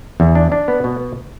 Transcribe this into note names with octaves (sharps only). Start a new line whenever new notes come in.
E2
D4
D4
B3
B2